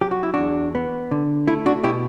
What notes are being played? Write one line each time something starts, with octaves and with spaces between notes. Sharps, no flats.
F#3 G4
F#4
E4
E2 D4 F#4
B3
D3
A3 E4
D4 F#4
B2 E4 G4